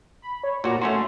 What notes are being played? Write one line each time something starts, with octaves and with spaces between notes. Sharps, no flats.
B5
C#5
A#2 F#4 A#5
A3 C#4 F#4 C6